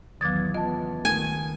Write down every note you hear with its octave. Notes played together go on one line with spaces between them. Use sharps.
B1 E2 D#3 E3 F#3 D6 G#6 A6
E2 C#3 B3 F4 D#5 A5
C#2 D#3 A3 G#5